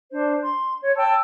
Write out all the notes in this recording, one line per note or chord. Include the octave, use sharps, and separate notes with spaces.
D4 C5
C6
C#5
G5 A5 E6